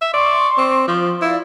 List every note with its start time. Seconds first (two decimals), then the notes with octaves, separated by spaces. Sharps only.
0.01 E5
0.14 D5 C6 C#6
0.58 C4
0.88 F3
1.22 E4 D5 F5